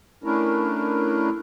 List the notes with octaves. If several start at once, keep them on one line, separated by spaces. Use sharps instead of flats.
A3 C#4 D4 E4 A#4